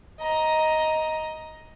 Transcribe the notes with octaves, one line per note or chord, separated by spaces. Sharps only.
D#5 A#5